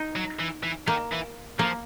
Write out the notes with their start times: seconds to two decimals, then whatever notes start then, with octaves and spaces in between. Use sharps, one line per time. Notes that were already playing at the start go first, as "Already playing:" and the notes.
Already playing: D#4
0.16 F#3
0.40 E3
0.63 E3
0.87 D#3 A#3
1.12 E3
1.59 F3 A#3